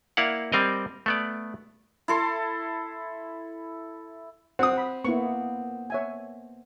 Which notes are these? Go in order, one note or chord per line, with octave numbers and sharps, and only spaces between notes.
A#3 E4 D5 F5 F#5
G3 C4 A#4 D#5
A3 B3 D5
E4 A4 C6
C4 F#5 D#6
F#5 B5
A#3 B3 E4 C#6
C#5 E5 G#5